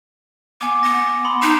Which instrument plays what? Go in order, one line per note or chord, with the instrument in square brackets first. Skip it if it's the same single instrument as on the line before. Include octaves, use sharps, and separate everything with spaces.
[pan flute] B3 [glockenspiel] G#5 D6
[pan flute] B3 [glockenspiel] A#6
[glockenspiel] B5 C6 D#6
[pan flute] D#4 [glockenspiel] E7